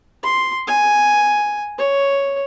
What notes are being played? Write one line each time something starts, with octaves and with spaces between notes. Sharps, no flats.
C6
G#5
C#5